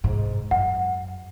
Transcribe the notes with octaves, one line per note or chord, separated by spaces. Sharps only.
G#2 C3
F#2 F#5